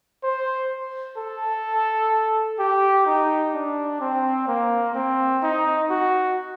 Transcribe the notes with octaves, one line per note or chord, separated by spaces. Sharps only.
C5
A4
G4
D#4
D4
C4
A#3
C4
D#4
F#4